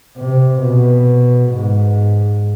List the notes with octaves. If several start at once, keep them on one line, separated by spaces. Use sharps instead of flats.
C3
B2
G#2